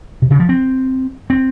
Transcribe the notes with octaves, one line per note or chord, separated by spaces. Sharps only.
C3
C#3
F3
C4
C4